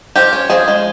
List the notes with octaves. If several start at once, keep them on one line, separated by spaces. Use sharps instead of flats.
F3 G4
C#4
F3 G#4
G#3